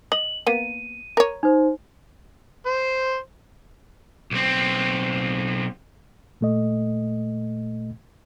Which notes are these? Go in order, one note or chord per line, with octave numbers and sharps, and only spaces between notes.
D#5 F#7
A#3 B3 D#7
A#4 C#5
D#4 C5
C5
B1 C4
A#2 A3 D#5